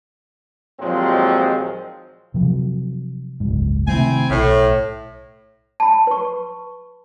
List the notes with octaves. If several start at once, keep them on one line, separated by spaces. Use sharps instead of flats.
D#2 A#2 F3 F#3 G#3 C4
C3 F3 F#3
F#1 C#2 G#2
C3 D#3 A3 C4 E4 G#5
B1 A2
A5 B5
B4 C#6